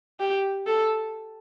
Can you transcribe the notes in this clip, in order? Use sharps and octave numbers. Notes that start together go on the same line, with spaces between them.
G4
A4